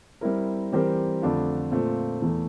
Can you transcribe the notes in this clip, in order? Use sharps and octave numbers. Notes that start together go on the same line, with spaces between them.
G3 C4 E4 A#4
E3 G3 C4 G4 A#4
F2 D3 A3 D4 F4
A#2 A3 C4 F4
E2 E3 A3